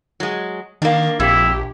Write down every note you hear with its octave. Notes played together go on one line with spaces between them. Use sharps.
F#3 G#3
D#3 A#3 D4
A#1 F2 E4 G4